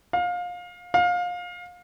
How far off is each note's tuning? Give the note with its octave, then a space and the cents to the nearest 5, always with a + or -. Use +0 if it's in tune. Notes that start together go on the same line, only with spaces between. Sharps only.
F5 +25
F5 +25